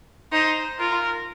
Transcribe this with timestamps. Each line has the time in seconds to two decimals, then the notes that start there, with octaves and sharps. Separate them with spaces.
0.32 D#4 C5
0.79 F4 A#4